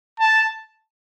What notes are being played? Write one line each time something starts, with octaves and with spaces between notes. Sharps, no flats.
A5